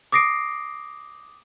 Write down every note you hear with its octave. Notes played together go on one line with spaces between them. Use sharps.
D6 D#6 A#6 C7 D7